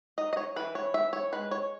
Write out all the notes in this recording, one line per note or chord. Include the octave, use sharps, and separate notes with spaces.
D#4 D#5
D#5
C#5
E3 B4
C#5
E3 E5
C#5
G#3 B4
C#5